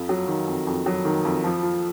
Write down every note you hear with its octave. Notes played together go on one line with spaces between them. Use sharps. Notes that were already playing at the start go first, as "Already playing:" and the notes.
Already playing: F2
F#3
D#3
F2
F2
F#3
D#3
F2
F3
F4